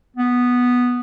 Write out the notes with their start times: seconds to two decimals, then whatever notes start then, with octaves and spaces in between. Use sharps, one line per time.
0.17 B3